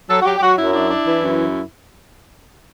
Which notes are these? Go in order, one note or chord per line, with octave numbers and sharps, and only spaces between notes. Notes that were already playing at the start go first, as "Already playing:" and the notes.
F#3 A4
F#4
F#3 G4
G4
F#3 F#4
F#2 E4
D4 E4
D4
E3
F#2